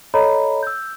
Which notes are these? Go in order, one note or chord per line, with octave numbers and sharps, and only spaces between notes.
A4 C#5 D#5 A#5 B5
E6 G6